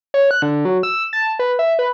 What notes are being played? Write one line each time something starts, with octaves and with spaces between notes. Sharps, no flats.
C#5
F#6
D3
F#3
E6
A5
B4
E5
B4